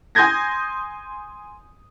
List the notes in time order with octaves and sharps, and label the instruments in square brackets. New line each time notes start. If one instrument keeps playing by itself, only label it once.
[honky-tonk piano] G#5 C6 D#6 G6 G#6 A#6